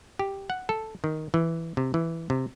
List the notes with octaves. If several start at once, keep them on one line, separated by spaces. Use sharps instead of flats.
G4
F#5
A4
D#3
E3
C3
E3
C3